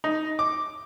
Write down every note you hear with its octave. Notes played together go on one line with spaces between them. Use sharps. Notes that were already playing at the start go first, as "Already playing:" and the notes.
D#4
D6